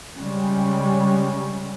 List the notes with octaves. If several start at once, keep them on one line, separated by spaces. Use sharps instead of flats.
C#3 G3 G#3 C#4